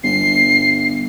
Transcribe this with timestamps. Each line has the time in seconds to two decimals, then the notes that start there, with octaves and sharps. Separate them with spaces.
0.04 G1 C7